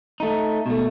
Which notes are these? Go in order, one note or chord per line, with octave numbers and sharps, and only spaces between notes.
A3 D#4
B2 A3